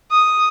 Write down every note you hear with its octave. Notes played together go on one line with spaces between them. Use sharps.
D#6